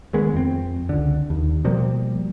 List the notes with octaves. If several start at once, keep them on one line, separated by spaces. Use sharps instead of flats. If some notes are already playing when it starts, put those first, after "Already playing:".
D2 D#3 G#3 B3
F2 C4
C#2 D3
D#2
B2 F3 G3 A#3